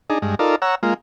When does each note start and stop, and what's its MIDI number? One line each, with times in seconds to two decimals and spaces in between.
0.10 0.18 62
0.10 0.18 63
0.10 0.18 68
0.22 0.35 43
0.22 0.35 56
0.39 0.56 63
0.39 0.56 65
0.39 0.56 69
0.39 0.56 70
0.39 0.56 74
0.62 0.75 73
0.62 0.75 78
0.62 0.75 82
0.62 0.75 88
0.83 0.94 56
0.83 0.94 58
0.83 0.94 65